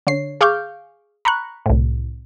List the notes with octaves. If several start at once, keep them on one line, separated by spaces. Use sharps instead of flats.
D3 C#5 C7
G#4 F5 C#6 D6 F6 G6
A#5 B5 C#6 F#6
C2 A2